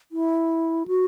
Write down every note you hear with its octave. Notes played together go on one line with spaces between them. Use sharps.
E4
F#4